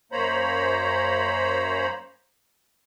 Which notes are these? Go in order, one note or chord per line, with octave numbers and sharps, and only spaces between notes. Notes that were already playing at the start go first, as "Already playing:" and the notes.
F#2 A#3 C5 C#5 A#5 B5